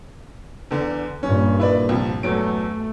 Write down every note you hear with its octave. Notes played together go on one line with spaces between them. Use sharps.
E2 D3
G2 A#2 C#4
E4 B4 D5
C2 F3
E2 F#3 A3 D7